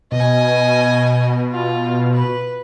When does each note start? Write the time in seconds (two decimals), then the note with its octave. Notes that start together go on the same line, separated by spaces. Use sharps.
0.12 B2 D#5 G#5
1.51 F4
2.13 B4